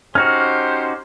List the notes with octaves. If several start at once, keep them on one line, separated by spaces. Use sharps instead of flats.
C#4 D#4 F#4 G4 C5 F6